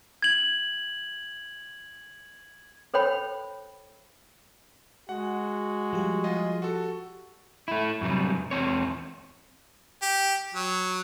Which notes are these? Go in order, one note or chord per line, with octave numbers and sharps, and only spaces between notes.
G#6 F#7
A4 C5 C#5 G5 B5
G#3 F#4 F#5
F3 G3 G4
F4 G#4 D#5
F#4 A4
A3 E4
F#2 C3 F#3 G3
E2 C4 C#5
G4
F#3